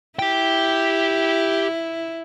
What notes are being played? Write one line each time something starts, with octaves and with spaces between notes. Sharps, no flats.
E4 G4 G5